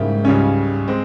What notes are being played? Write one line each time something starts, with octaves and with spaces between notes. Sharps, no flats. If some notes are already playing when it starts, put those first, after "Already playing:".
Already playing: G#2 C#3 G3 A#3 E4 G4
C#2 C#3 G3 C#4
G#3 C4